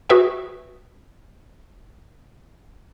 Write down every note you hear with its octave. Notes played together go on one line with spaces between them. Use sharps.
F#4 G#4 B4 E5 G5